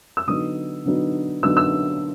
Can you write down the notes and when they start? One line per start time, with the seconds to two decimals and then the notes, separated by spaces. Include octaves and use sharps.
0.17 E6
0.27 D3 F#3 B3 D#4 D#6
0.86 D3 F#3 B3 D#4
1.43 D3 F#3 B3 D#4 E6
1.57 E6